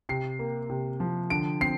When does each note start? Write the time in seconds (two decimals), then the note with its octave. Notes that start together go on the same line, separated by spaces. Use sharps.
0.09 C3 C7
0.39 A#3
0.69 C3
1.00 F3
1.30 D3 D7
1.61 C4 C7